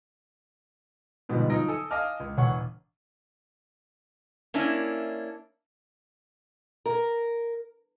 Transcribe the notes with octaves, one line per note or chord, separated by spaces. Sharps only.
G#2 B2 D3 F3 G3
F3 F#3 D#4 A#6 D7
A4 G#5 D#6
D#5 F5 G#5 A5 D6 F6
C#2
E1 C#5 F#5 C#6
A#3 C#4 D4 E4
A#4